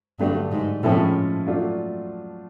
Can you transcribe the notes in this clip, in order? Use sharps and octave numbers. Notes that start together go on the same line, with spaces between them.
G2 D3 F#3 A3 D4
G#2
A2 F3 G#3 C#4 E4 A4
F#3 A3 D4 F4